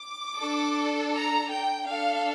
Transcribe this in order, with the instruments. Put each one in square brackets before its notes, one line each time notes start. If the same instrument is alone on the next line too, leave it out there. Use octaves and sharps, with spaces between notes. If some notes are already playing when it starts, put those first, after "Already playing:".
Already playing: [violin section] D6
D4 A4
A#5
G5
D4 A4 F5